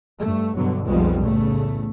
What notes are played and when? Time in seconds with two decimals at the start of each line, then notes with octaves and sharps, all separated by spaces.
0.18 G2 A3
0.55 G2 B2 D3 F#3
0.86 B1 F2 B2 F3 G3 G#3
1.22 E2 A2 C#3 A3